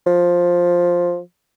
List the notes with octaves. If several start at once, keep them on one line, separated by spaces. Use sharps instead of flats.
F3